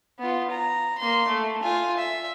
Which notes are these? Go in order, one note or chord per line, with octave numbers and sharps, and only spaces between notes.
B3 F4
A#5
A#3 C6
A3
F4 G#5
E5